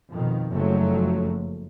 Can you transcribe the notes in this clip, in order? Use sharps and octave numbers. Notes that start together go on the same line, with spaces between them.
F2 B2 D#3
F#1 F2 F3 F#3 A3